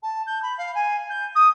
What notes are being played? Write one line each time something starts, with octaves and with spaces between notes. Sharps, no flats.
A5
G6
B5
F5
G#5
G6
D#6